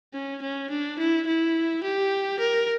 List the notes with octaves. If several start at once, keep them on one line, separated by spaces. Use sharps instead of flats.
C#4
C#4
D4
E4
E4
G4
A#4